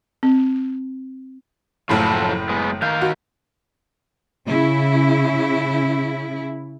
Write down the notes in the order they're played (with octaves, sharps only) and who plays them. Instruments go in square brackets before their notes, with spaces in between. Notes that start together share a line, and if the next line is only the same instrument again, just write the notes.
[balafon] C4
[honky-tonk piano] F#1 A2 B5 [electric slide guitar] F3 F#3 A4
[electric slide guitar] G#3 B3
[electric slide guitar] D#3 F5 [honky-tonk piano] G6
[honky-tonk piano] F#4
[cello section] C#3 E4